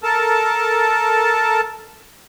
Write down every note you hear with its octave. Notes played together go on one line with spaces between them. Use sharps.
A4 A#4 A5